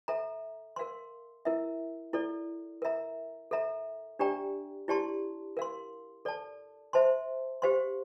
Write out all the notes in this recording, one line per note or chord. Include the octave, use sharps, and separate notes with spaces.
A4 E5 A#5
A#4 F5 C6
E4 A#4 E5
E4 A4 D5
A#4 E5 A#5
A4 E5 A#5
D4 G4 D5 G5 A#5
E4 G4 D5 A5 C6
A#4 F5 C6
A4 D5 A5
C5 E5 A5 C6
G4 C5 F5 C6